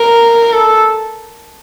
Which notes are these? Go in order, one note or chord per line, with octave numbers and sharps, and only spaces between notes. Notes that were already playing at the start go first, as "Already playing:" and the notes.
Already playing: A#4
A4